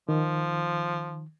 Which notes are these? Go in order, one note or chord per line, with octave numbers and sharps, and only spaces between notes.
D#3 F3